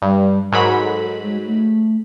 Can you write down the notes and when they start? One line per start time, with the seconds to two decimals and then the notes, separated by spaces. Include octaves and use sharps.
0.02 G2 G3
0.52 G#2 F#3 A#4 B5
0.79 A4
1.24 G#3
1.45 A3